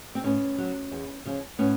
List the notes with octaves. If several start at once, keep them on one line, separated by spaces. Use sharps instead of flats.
C4
A2 B3 C#4
F#3
E2
C#3 F3
A2 B3 C#4